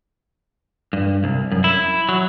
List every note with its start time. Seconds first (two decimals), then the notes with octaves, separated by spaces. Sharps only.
0.93 G2
1.24 C2
1.52 F#2
1.64 E4
2.09 F#3